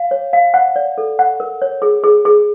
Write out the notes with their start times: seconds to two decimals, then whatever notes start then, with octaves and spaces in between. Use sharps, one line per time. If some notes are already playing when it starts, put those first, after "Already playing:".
Already playing: F5
0.11 C#5
0.33 F5
0.54 F#5
0.76 D5
0.98 A4
1.19 F#5
1.40 A#4
1.62 C#5
1.82 G#4
2.04 G#4
2.25 G#4